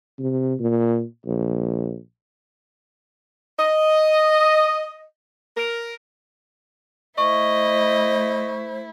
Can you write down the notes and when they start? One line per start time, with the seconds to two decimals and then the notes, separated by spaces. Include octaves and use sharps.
0.19 C3
0.60 A#2
1.26 A#1
3.58 D#5
5.56 A#4
7.18 A3 E4 C5 D#5 C#6